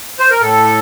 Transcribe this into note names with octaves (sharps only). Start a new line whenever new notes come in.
C5
A#4
A2 A4